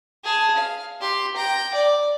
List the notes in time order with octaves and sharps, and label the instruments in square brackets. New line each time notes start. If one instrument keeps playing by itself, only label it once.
[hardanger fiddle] G#4 A5
F5
G4 C6
G5 A#5
D5